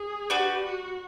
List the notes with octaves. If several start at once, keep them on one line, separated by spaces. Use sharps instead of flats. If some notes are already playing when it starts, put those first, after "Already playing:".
Already playing: G#4
D4 F#4 G4 B4
F#4